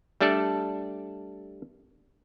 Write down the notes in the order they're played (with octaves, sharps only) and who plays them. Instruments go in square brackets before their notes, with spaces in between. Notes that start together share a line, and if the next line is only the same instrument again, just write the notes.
[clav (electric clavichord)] G3 A3 D4 A4 D5